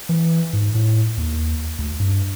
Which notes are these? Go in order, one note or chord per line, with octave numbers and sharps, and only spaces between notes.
E3
G#2
A2
D#2
D2
G2